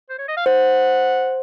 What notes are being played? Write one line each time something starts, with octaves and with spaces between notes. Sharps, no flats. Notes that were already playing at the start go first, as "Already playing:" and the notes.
C5
C#5
D#5
F5
C5 F#5